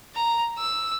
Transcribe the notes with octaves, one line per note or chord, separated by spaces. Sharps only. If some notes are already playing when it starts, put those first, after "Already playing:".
A#5
E6